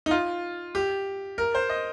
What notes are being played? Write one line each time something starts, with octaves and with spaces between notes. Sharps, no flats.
D#4
F4
G4
A#4
C5
D#5